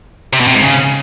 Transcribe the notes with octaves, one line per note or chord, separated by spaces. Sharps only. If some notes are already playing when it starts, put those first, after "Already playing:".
C3
B2
C3
G#2
C#3